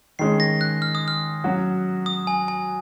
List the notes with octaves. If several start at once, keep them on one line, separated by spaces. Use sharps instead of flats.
D#3 G#3 C#4 C7
A#6
F#6
F6
D#6
F6
F#3 C#4 F#4
D#6
G#5
G#5